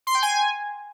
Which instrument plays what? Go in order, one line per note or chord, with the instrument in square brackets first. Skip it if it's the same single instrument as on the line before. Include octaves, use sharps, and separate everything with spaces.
[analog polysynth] C6
G5
G#5